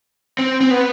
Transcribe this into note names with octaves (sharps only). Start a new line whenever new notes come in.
C4
C4
B3